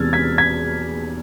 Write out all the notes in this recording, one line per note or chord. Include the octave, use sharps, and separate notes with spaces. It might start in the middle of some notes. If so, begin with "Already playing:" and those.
Already playing: E2 C3 G#3 E6 F6 G#6 A6
G#6 B6
G#6 B6